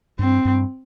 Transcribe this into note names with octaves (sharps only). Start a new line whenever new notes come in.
G2 C4
G2